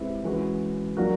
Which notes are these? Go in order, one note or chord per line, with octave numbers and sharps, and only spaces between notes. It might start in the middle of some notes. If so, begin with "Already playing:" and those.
Already playing: G#3 C4 E4 G4 B4
E3 G#3 C#4 F#4 B4
F#3 A#3 D4 F#4 A#4